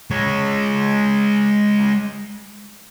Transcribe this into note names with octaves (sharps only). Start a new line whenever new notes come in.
G#3 C#5